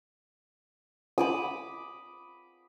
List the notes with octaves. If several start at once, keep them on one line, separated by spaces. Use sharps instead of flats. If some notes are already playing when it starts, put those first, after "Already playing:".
B5 D6 D#6